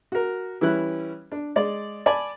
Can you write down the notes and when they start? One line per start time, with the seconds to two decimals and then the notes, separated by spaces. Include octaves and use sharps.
0.12 F#4 A#4
0.61 E3 G3 C#4 E4 F#6
1.32 D4
1.56 G#3 D5
2.06 D5 G#5 A5 B5